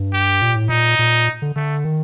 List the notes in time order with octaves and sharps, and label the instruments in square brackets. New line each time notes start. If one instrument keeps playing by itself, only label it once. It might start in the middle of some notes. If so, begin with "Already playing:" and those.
Already playing: [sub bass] G2
[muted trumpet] G4
[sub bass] A#2
A2
[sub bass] A#2 [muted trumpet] D#4
[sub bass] A#2
D3
[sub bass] D3 [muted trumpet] A3
[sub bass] D#3